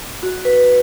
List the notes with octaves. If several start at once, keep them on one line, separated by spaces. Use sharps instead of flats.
F#4
B4